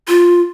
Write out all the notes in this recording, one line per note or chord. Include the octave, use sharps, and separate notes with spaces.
F4